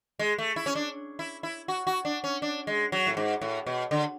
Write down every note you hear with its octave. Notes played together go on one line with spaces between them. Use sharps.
G#3
A3
E4
C#4
D4
E4
E4
F#4
F#4
D4
C#4
D4
G#3
F#3
A2
G#2
A2
B2
D3